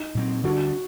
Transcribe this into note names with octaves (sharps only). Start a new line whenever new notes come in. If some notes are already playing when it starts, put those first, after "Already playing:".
Already playing: D#4
A#2 F#3 C4
D2 D3 G3 D4 F#4